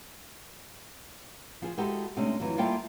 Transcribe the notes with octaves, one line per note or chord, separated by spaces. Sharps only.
F3 F4 G#4
G#3 E4 F#4 G4 A4
C3 G#3 A3 C#4 D4
F2 E3 F#3
G3 A#3 F4 A4 E5 G5